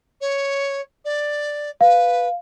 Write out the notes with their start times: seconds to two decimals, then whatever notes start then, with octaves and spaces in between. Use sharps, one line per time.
0.21 C#5
1.05 D5
1.81 B4 F5